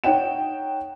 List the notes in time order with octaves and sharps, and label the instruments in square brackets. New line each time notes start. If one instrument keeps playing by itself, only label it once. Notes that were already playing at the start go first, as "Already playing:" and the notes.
[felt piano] D#4 C#5 F#5 G5 E7